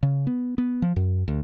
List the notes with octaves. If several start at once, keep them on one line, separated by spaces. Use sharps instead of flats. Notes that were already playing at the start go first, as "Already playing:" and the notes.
C#3
B3
B3
F3
F#2
D2